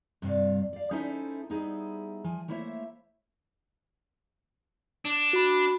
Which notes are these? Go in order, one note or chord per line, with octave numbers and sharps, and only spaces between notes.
G2 C3 G3 C#5 D5 F5
D5 F5
C#4 D#4 E4 A4 C5 E5
G3 B3 D#4 E4 G#4 C5
F3 G#5
A3 A#3 E4 C5 C#5 E5
D4
F#4 B5